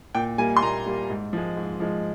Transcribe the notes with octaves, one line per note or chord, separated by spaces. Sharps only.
A#2 G5
G3 A#3 G#5
C6
A#2 A#5
G3 A#3
G#2
F3 G#3
G#2
F3 G#3